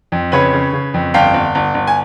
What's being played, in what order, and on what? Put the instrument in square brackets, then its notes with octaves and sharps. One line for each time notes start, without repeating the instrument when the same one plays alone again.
[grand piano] F2
C#3 B4 C#5
C#3
C#3
F2
G1 F5 G5
G1
G1
G1
G#5